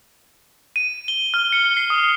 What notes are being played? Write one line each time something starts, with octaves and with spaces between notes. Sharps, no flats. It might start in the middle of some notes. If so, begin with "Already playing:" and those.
D#7
G7
F6
C#7
C7
D#6